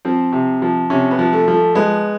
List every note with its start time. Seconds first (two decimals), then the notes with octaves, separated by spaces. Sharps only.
0.05 F3 C4
0.33 C3
0.62 F3
0.90 C3 C#4
1.11 B3
1.19 F3
1.33 A3
1.48 F3
1.54 A3
1.75 G#3 B3